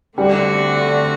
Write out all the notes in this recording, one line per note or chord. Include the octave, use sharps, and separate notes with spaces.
D3 G3 A3 C4 F#4